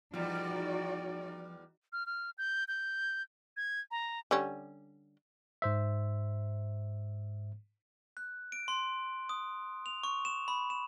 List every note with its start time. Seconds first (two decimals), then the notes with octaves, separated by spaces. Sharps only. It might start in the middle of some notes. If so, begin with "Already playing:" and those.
0.14 E2 F3 G3 D#4 F#4 D5
1.93 F6
2.06 F6
2.38 G6
2.68 G6
3.57 G#6
3.91 A#5
4.31 D3 G3 C#4
5.62 G#2 C5 E5
8.17 F#6
8.52 D7
8.68 C6
9.29 D#6
9.86 F7
10.04 C#6
10.25 E7
10.48 B5
10.70 E7